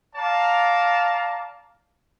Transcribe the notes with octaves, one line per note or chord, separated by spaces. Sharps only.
D5 F5 A5 A#5